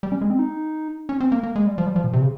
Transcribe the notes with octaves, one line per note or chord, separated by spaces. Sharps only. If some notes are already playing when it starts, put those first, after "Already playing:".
G3
C#4
G#3
C4
D#4
C#4
C4
A#3
A#3
G#3
G3
F3
G3
F3
A#2
C3
C#3